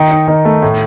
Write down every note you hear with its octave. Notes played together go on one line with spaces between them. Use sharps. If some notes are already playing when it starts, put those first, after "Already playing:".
Already playing: D#3
D#4
D#3
A3
A2